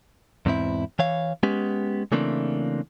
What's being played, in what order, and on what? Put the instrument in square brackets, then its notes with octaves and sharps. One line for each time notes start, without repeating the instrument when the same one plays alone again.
[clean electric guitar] E2 G#2 C4 E4
E3 C#5 F5
G#3 B3 C#4 G4
C#3 E3 A3 A#3 C4 D4